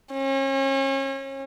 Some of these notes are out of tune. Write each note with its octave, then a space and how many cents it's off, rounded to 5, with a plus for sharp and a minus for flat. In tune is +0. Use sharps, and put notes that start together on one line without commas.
C#4 -35